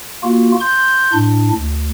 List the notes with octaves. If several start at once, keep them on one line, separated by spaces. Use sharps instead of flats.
A#3 F4 F#4
C6 G6
A2 D4
D2